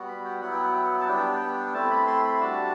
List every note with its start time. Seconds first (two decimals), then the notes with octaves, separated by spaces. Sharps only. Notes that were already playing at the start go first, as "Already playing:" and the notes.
Already playing: G3 B3 F#4
0.08 B5
0.25 G5
0.41 F#3 B3 E4 F#5
0.52 G5
0.63 F#5
0.73 G5
0.83 F#5
1.00 A5
1.08 G3 B3 D4 G5
1.73 A3 C4 E4 A5
1.91 B5
2.07 C6
2.24 B5
2.40 G3 D4 F#4 A5